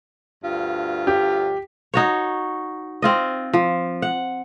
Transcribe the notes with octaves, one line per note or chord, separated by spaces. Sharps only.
D2 G2 F4
G4
D#4 F#4 C#5
C4 F4 D#5
F3
F#5